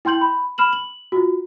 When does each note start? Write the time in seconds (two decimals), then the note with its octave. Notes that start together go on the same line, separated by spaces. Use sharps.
0.05 E4 G5 C6 G6 F#7
0.21 B5
0.58 B5 F6 E7 F#7
0.73 F#7
1.12 F4 F#4